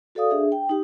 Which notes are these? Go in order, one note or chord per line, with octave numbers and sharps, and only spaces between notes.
F#4 A4 D5 F5 D#6
D4 G#4 E5
G5
D#4 G4